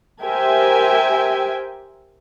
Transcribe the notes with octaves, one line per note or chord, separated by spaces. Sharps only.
G4 A#4 C5 E5 G5 G#5